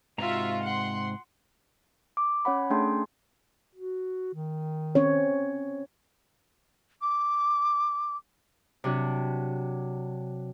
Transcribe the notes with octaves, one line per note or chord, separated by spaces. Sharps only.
G#2 C3 F4 F#4 E5 A#5
F#5 C6
D6
C#4 C#5 F#5 B5
A3 C#4 D4 G#4 G5 C6
F#4
D#3
C4 C#4 C#5
D6
C3 F#3 D4